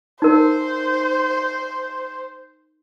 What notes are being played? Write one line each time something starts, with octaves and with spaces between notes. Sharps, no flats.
D#4 A#4 C5